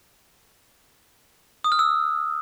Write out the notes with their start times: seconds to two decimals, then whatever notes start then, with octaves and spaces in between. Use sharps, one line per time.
1.64 D#6
1.72 F6
1.79 E6